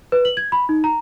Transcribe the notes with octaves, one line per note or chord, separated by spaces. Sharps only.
B4
F#7
G#6
B5
D#4
A#5